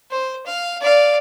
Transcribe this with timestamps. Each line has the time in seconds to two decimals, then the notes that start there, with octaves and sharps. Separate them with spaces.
0.10 C5
0.46 F5
0.81 D5 F5